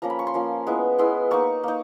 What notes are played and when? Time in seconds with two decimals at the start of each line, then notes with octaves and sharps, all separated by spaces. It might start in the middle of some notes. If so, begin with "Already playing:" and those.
0.02 F3 A#3 C#4 A#5
0.10 B5
0.19 C#6
0.27 C6
0.34 F3 A#3 C#4
0.67 G#3 B3 E4
0.98 G#3 B3 E4 C6
1.31 A#3 D#4 C#6
1.63 A#3 D#4